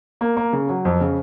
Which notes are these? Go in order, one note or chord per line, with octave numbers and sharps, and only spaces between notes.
A#3
A#3
C#3
F#3
F2
C#3